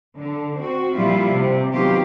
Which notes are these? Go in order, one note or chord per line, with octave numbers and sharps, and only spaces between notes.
D3
C4 F#4
A#2 F3 G3 E4 F4
C3
D#3 F#3 B3 F4 G4